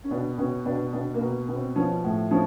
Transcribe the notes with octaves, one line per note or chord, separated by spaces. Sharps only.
C#4
B2 D4
B2 C#4
B2 D4
B2 D4
A#3
B2
B2
C4
F3 C#4
A2
F3 C#4